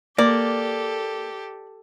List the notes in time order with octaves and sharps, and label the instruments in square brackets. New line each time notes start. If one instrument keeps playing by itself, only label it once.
[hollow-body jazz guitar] A#3 [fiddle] G4 A4 [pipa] D5